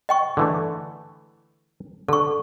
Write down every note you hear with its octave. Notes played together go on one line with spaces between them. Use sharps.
D#5 G5 C#6
D3 E3 A3
D3 A4 C#6